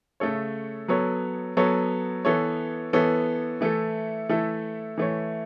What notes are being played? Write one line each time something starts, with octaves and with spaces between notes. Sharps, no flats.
C#3 A3 C#4 A4 C#5
F#3 B3 A4 C#5
F#3 B3 A4 C#5
E3 B3 A4 C#5
E3 B3 A4 C#5
E3 A3 E4 A4
E3 A3 E4 A4
E3 A3 E4 C#5